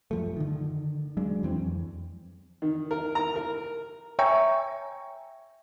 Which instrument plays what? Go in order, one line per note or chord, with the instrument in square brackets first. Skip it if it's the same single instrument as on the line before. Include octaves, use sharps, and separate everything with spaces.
[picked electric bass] F#2 F3 A3
D3 D#3
F#3 G#3 D4
F2 E3 C4
F2
[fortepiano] D#3
A#4
A#5
A#4
[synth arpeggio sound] C#5 E5 G5 G#5 A#5 C#6